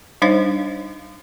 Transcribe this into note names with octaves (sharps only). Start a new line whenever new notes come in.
G3 D4 D#4 C5 C#5 F5